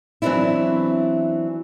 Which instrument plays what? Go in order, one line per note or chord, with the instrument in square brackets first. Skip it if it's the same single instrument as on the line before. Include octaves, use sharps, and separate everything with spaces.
[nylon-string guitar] E3 F#3 B3 C4 D4 E4